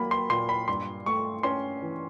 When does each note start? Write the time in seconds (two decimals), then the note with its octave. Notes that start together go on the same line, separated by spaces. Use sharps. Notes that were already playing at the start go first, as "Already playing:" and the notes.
Already playing: F#3 A#3 B5
0.11 C6
0.30 A#2 C6
0.49 B5
0.68 G2 C6
1.06 A3 C#6
1.43 C#4 C6
1.82 E3